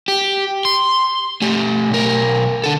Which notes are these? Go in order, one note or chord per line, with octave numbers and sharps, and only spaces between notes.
G4
C6
A3 G4
B1 A#4
D3 A4